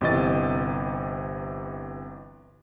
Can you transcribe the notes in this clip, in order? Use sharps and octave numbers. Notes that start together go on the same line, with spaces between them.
G1 C3 E3 D#5 A6